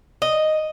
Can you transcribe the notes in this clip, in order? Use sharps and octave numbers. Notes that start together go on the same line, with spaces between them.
D#5